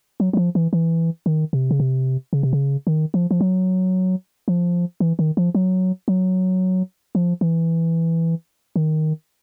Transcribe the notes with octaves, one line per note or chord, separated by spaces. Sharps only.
F#3
F#3
F3
E3
E3
D#3
C3
C#3
C3
C#3
C3
C#3
D#3
F3
F3
F#3
F3
E3
D#3
F3
F#3
F#3
F3
E3
D#3